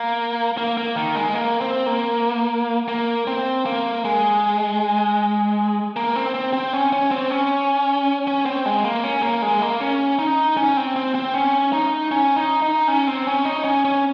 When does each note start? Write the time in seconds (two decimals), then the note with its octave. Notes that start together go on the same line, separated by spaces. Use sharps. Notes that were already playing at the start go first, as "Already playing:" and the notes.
Already playing: A#3
0.58 A#3
0.77 A#3
0.96 D#3
1.15 G#3
1.34 A#3
1.61 C4
1.86 A#3
2.88 A#3
3.27 C4
3.66 A#3
4.05 G#3
5.96 A#3
6.16 C4
6.34 C4
6.53 C4
6.73 C#4
6.93 C#4
7.11 C4
7.30 C#4
8.27 C#4
8.46 C4
8.66 G#3
8.84 A#3
9.04 C#4
9.22 A#3
9.42 G#3
9.62 A#3
9.80 C#4
10.19 D#4
10.57 C#4
10.77 C4
10.96 C4
11.15 C4
11.34 C#4
11.73 D#4
12.11 C#4
12.36 D#4
12.62 D#4
12.88 C#4
13.07 C4
13.27 C#4
13.45 D#4
13.64 C#4
13.85 C#4